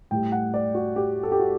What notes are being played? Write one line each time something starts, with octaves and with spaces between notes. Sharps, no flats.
A2 G3 G5
F#5
D5
F#4
G4
A4
G4
F#4